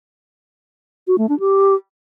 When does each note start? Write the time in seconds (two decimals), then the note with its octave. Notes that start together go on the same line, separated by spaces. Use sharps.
1.07 F#4
1.18 A3
1.29 D4
1.40 G4